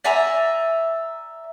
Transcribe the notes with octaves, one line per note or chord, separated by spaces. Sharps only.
D5 E5 G#5 A#5